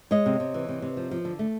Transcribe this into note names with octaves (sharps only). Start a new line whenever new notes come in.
G#3 C#5 D#5
C3
C3
E3
C3
C3
F3
F3
D3
A3